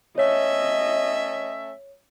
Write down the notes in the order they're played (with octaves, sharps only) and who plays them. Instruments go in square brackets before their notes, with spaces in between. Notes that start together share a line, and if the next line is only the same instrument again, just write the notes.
[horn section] A3 C#4 E5 [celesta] C#5 [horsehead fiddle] D#5